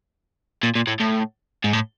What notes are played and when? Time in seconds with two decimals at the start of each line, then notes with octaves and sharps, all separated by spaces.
0.63 A#2
0.75 A#2
0.87 A2
1.00 A2
1.64 G#2
1.73 A2